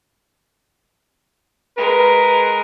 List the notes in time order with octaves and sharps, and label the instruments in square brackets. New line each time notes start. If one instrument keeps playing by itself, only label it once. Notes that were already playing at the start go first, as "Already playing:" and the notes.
[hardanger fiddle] G#3 A#4 [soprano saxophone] B4